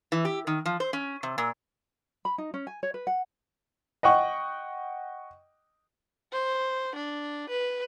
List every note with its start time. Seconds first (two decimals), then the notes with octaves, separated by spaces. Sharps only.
0.12 E3
0.25 G4
0.47 D#3
0.66 F3
0.80 C5
0.93 C#4
1.23 C3
1.38 A#2
2.25 B5
2.38 D#4
2.54 C#4
2.67 G#5
2.83 C#5
2.94 B4
3.07 F#5
4.03 D#5 F#5 G5 C#6
6.32 C5
6.95 D4
7.49 B4